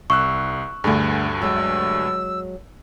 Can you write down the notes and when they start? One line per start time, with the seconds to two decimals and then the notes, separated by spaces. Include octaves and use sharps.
0.10 C2 C#6 E6 F#6
0.84 D2 G2 D3 A3 G#4
1.42 F#3 G#3 E6